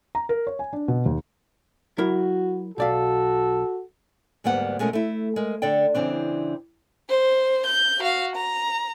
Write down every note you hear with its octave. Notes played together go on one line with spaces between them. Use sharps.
A#5
A#4
C#5
G#5
D4
B2
D#2
F#3 E4 F#4 A#4
B1 F#4 A4 D5 F5
D2 G#2 G3 A#3 B3 F#5
B2 G#3 A3 C#4 A#4
A3 E4
G#3 A#4
D3 A4 D5 G5
C#3 E3 C4 D4
C5
G6
F#4 F5
A#5